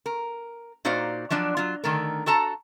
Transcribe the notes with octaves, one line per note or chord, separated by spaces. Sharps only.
A#4
A#2 D#4 F#4 C5 D5 F5
F3 F#3 D4 D5
F#3 F4
D3 D#3 A3 A#4
F#4 A4 A5 A#5